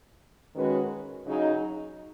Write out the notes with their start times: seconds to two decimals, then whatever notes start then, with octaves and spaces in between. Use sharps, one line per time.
0.54 D#3 G#3 C#4 F#4 B4
1.25 C#3 F#3 D#4 G#4